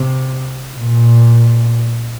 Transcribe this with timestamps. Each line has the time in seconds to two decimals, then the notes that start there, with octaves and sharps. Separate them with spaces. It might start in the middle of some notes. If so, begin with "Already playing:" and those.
Already playing: C3
0.77 A#2